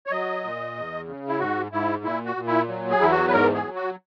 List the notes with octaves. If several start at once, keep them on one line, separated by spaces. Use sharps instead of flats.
C#5
F#3 D#5
A#2
E2
C#3
E4
G#2 F#4
G#2 E4
A#2 E4
F#4
A#2
E4
F#3
G#4
E2 E4
F#4
B4
G#2 A#4
G#4
F#3
F#4